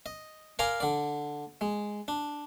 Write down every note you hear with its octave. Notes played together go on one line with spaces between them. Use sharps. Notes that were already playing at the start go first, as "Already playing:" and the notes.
D#5
A#4 D5 F5 G#5 A#5 C6
D3 D5
G#3
D4